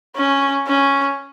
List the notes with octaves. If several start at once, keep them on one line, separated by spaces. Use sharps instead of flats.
C#4
C#4